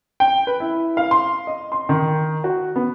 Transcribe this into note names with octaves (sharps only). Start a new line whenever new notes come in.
G5
B4
E4
F5
C6
D#5
C6
D#3
F#4
B3